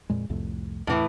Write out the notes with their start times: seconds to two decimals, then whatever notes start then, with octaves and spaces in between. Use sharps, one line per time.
0.10 F2 A#2 G#3
0.30 C2 F2 A2
0.87 E2 A2 E3